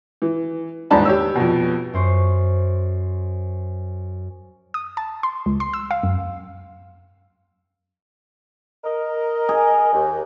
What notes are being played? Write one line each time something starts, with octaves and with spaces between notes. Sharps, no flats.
E3
D#1 E2 G#2 D4 A5 B5
G4 C#5 E6
F2 B2
F#2 C5 C#6
D#6
A5
C6
C#2
C6
E6
F5
F#2
A#4 D#5
G#4
D#2